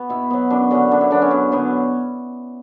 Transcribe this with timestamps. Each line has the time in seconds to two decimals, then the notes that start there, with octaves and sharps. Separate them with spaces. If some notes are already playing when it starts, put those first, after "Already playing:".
Already playing: B3 F#4
0.09 B2 E4
0.30 F#3 B3
0.50 F#2 D4
0.71 D3 F#3 B3 C#4
0.91 F#2 D4
1.01 E4
1.11 D3 F#3 B3 D4
1.22 C#4
1.31 F#2
1.52 D3 F#3 B3